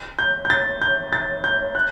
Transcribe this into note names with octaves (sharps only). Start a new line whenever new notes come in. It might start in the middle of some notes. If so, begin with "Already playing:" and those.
G6
G6
A6
G6
A6
G6
F#6